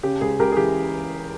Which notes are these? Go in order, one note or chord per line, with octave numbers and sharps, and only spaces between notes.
C#3 G4
C#2 G#4
C#2 G4 A#4
G#4
E3 G4